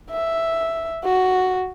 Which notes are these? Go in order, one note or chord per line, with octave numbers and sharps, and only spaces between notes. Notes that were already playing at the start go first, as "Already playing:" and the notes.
E5
F#4